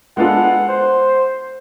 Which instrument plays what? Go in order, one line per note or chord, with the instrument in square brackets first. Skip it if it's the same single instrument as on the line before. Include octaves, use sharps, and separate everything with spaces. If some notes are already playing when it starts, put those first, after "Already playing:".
[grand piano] G#3 B3 D4 F4 A4 [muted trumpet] F#5
[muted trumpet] C5